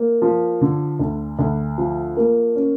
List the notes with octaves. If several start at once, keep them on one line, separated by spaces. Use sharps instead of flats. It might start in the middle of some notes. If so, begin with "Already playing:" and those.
Already playing: A#3
F3
D3
D2
D2
F3
A#3
C#4